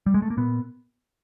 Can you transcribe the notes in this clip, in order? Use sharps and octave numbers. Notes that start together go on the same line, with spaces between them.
G3
G#3
A3
A#3
A#2 B3